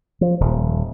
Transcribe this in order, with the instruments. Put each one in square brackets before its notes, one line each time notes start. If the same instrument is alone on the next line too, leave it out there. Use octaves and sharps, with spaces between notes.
[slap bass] F3
D#1